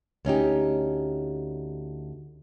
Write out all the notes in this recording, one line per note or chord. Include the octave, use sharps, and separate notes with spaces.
D2 C#4 D#4 G4